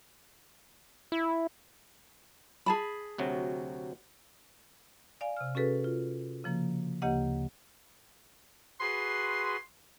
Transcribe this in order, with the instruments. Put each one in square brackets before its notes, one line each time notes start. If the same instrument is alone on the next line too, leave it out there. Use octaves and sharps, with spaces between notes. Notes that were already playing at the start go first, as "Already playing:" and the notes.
[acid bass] E4
[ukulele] G#4 A5 B5
[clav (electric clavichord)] D2 C3 F#3
[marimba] D5 F5 G#5
C3 F6
C#4 F#4 G#4 A4 B4
F4
C#3 F3 A#3
D2 C#3 A#3 G4 D#5 F#5
[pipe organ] F#4 G#4 B4 [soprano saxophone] C6